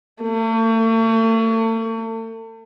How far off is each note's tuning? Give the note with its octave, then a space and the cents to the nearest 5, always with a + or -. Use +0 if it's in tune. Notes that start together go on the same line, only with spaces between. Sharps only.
A3 +40